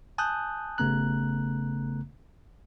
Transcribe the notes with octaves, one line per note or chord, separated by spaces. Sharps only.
G#5 A5 D#6 F#6 G6
G#1 C#3 A3 B3 A#5 F#6